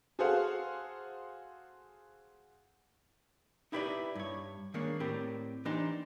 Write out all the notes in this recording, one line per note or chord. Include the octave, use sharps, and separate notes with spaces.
F#4 G#4 A4 C5 F5 F#5
D#4 E4 G4 B4 C5 D5
G2 C#5
D#3 G#3 A#3 D4 C#5
A2 C4 G4 A#4 D5
E3 A#3 D4 D#4 G4 C5